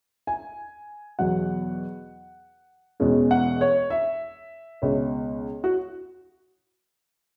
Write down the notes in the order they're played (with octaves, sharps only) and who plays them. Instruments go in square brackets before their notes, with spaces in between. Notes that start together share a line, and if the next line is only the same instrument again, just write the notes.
[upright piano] G#5
E2 B2 F#3 F#5
E1 E2 B2 G#3 C#4
F#5
C#5
E5
C#2 B2 G#3 C#5
F#4